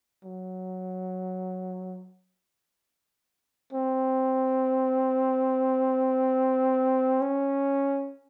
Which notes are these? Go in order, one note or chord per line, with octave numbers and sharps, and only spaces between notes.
F#3
C4
C#4